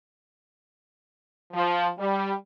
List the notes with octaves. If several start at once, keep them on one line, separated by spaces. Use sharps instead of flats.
F3
G3